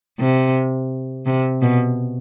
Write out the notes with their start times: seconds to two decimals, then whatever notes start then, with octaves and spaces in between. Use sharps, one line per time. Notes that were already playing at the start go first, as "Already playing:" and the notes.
0.19 C3
1.26 C3
1.62 B2